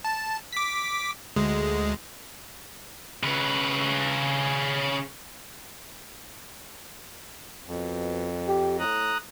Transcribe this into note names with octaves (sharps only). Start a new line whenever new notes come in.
A5
D6 B6
D2 G#3
C#3 B4
F2 B2
G4
A2 A#5 D#6 F#6